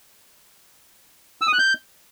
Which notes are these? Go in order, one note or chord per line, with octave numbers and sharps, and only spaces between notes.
E6
D#6
F#6
G6